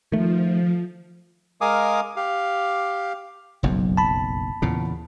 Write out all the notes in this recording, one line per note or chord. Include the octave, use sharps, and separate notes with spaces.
D#3 F3 A3
G#3 A#4 F5 G#5 D6 D#6
G4 F5
F#1 B1 F2 F#3
A5 B5
E2 A#2 C#3